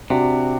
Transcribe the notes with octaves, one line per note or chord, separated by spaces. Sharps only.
C3 D4 F#4